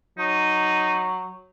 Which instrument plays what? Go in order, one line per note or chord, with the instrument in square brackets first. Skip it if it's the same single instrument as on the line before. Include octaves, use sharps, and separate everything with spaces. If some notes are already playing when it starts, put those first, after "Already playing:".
[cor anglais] F#3 [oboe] D#4